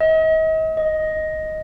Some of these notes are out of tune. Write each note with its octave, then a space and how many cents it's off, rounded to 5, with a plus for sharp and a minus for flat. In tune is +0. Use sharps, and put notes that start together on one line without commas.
D#5 +40
D#5 +5